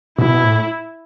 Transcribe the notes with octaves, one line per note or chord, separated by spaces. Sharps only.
B2 E4
B2
A2